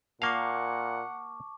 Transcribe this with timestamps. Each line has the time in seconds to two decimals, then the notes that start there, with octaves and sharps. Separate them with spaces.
0.22 A#2 A#3 F5 F#5 A5 C#6 D6